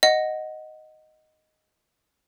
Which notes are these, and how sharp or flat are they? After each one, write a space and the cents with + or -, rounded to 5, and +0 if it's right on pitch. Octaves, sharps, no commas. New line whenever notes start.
D#5 +0 F#5 +0